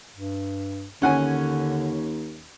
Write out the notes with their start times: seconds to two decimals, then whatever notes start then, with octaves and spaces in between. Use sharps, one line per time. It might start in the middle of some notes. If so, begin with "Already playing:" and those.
0.14 G2
1.02 D#2 D3 C#4 F#5 G#5